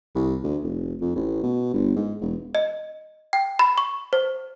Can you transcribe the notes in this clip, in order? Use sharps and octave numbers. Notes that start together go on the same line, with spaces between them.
C2
D2
F1
F2
A1
B2
G1
G#2
E1
D#5
G5
B5
C#6
C5